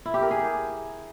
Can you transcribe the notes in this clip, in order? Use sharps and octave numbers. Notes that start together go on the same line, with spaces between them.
E4
G4
A#4
G#4